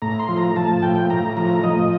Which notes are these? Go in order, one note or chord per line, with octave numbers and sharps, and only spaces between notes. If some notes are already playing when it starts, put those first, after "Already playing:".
A2 A#5
C6
F3
A#5
F3 A5
A2 G5
A2 A#5
F3 A#5
F3 D#5